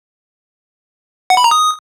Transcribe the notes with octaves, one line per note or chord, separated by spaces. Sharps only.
F#5
B5
A#5
D#6